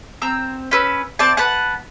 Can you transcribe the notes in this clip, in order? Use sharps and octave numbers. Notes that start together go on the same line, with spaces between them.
C4 A#5 E6
C#4 B4 E6
C4 D5 A5
B4 F#5 A5